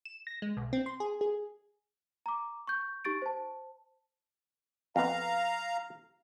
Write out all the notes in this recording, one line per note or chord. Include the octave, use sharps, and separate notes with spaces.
E7
A#6
G#3
B1
C4
C6
G#4
G#4
A#5 D6
C#6 G6
D#4 G4 C#6 A6 D7
C5 A5
F2 B3 F5 A#5